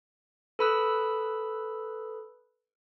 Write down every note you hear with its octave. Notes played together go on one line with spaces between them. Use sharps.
A4 B4 B5 D#6 E6 F#6